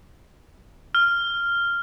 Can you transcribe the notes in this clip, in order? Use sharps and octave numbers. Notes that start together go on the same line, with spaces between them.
F6